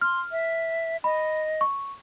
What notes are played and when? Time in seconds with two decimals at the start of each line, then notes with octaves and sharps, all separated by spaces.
0.01 C6 F6
0.32 E5
1.04 D#5 B5
1.61 C#6